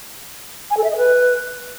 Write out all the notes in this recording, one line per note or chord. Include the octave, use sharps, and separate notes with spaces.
G#5
A4
E5
D#5
B4